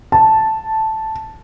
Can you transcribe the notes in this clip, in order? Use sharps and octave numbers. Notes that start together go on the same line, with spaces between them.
A5